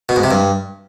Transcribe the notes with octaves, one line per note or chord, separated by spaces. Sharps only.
B2
G#2
C3
G2